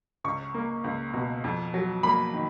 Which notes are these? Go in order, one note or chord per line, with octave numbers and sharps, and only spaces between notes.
C#2 C#6
A#3
C#2
B2
F2
F#3
A#3 B5
D#3